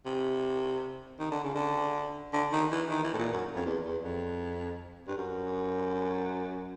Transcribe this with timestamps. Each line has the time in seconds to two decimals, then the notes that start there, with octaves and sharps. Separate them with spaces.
0.06 C3
1.19 D#3
1.31 D3
1.43 C#3
1.55 D3
2.33 D3
2.52 D#3
2.71 E3
2.90 D#3
3.04 E3
3.13 A2
3.19 A#2
3.32 F#2
3.55 F2
3.66 E2
3.85 E2
4.03 F2
5.08 G2
5.17 F#2